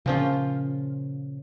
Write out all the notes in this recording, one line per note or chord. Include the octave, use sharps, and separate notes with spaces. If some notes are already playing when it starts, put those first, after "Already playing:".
A#2 C#3 F3 C#4 F4